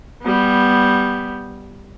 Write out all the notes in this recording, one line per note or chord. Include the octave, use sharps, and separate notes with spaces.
G3 B3